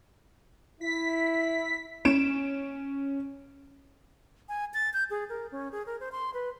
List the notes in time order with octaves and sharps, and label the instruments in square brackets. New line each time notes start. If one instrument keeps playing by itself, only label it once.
[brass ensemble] E4 [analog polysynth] B6
[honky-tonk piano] C#4 D7 E7
[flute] G#5
A6
G6
G#4
A#4
C#4
G#4
A#4
C5
C6
B4